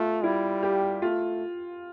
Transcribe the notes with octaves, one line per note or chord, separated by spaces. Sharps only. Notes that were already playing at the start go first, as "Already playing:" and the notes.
Already playing: A3 F4
G3 E4
G4
A3 F4